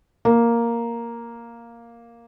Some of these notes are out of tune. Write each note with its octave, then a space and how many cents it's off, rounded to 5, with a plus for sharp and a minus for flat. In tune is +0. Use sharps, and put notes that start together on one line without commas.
A#3 +0